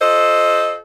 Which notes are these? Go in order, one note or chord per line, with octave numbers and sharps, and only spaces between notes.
F4 A4 C5 D#5